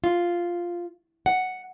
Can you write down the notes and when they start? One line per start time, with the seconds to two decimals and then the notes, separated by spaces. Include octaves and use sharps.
0.04 F4
1.26 F#5